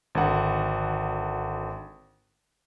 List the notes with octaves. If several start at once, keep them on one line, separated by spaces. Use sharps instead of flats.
G#1 D3 F#5